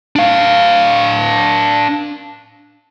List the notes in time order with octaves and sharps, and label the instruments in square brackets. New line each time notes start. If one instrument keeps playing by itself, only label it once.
[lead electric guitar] D4 F5